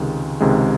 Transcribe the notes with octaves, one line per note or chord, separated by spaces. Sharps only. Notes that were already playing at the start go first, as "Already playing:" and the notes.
Already playing: C#2 C3 D#3 G#3
C#2 C3 D#3 G#3